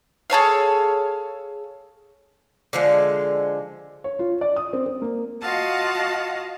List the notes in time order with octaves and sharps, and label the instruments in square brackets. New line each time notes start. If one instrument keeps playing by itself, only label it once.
[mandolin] G#4 A4 C#5 F5
[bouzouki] D3 F3 G#3
[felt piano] C#5
F4
D5
D#6
C4
C4
A#3
[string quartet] F4 F#4 D#5 F5 F#5 A5